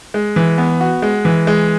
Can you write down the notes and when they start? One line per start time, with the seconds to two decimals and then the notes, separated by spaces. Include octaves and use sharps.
0.14 G#3
0.36 E3
0.58 B3
0.81 F#4
1.02 G#3
1.25 E3
1.47 G#3